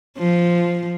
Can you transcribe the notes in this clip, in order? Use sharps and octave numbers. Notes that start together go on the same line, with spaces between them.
F3